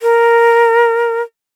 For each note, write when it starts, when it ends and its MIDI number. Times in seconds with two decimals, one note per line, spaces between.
0.02 1.21 70